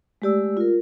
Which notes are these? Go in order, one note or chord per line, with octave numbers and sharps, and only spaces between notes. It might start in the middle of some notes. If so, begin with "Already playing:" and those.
G#3 A3 G4 D5 E6
F4 A#4